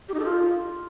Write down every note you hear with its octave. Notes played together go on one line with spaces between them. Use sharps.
G4
D#4
A4
F4